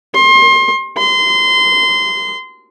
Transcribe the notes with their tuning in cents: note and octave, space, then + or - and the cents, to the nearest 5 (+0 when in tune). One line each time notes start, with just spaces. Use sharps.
C6 +30
C6 -20